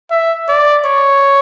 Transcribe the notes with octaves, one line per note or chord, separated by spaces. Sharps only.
E5
D5
C#5